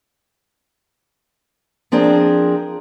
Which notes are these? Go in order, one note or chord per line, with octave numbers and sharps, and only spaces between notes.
F3 C4 D4 G#4 A#4